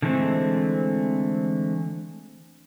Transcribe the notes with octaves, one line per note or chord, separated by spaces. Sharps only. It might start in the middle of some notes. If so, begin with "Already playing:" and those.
D3 E3 G#3 A3 C4